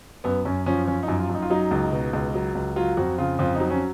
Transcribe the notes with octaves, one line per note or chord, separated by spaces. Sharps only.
F#2 B3
F#2 C#4
F3 C#4
F3 C#4
D#4
F#2
F4
F#2
D#4
F4
F#3 D#4
C#2
B2
C#2
F#3
C#2
F#3 F4
F2 F#4
C#3 F4
F2 F4
F#3 D#4
C#4